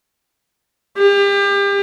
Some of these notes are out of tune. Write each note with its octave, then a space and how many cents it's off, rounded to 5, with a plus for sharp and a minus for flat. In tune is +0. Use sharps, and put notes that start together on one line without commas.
G4 +35